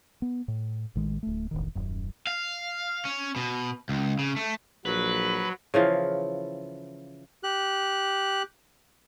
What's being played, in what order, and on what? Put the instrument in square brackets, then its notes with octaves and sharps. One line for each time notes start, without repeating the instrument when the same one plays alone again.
[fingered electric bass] B3
A2
A1 D#3 G#3
D1 A3
E1 A1 D#3
D#1 F#2
[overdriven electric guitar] F5
C#4
B2
C#2
C#3
A3
[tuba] A#1 [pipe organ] F#3 [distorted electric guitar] B4
[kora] C#3 E3 F3 F5
[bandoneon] G4 F#6